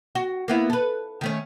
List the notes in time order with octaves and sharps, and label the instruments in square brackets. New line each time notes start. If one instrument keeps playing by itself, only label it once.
[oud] F#4
A#3 B3 E4
A4 B4
D#3 A3 C#4